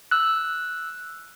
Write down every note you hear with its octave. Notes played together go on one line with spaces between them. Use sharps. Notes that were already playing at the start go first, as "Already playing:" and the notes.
E6 F#6